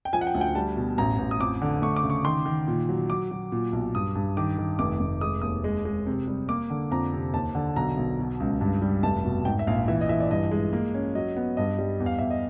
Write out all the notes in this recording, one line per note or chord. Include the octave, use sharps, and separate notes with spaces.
G5
F3 G#5
F#5
G5
D2
G5
G3 A5
B2
A1 A#5
A1
D#6
F2 D6
D3
A3 C#6
D6
C#3
C#6
D#3 C6
D#3
A#2
F#3
F#3 D6
F#3
A#2
B1
G2 D#6
G2
D#3 D6
D#3
F1 D6
F1
G#3 D#6
D#2 D#6
G#3
G#3
C3
G3
A#3 D6
D3
F2 A#5
C3
D#2 A5
D3
B1 A#5
B1
B2
C#2
G2
G3
F1 A5
B2
G#2 G5
E5
A#1 F5
E3 E5
D#5
E3 E5
D5
G2 D#5
G#3
A#3
C#4
F#3 D#5
B3
G2 D#5
G3
E2
F5
E2 E5
D#5